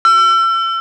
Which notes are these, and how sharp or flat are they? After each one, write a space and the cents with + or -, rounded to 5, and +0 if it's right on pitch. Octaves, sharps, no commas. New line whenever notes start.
E6 +35